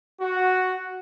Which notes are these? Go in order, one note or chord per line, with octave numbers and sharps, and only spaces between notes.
F#4